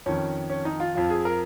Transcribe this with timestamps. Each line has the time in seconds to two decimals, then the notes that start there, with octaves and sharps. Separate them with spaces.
0.06 F2 D#3 C#4
0.50 C#4
0.65 D#4
0.80 F4
0.95 F2 F3 F4
1.10 G#4
1.25 A#4